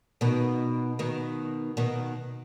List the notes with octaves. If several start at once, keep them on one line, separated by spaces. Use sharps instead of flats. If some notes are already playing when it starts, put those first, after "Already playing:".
B2 D#3
B2 D#3
B2 D#3